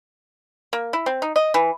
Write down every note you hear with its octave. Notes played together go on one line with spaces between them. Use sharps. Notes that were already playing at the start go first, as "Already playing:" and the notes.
A#3
E4
C4
D#4
D#5
E3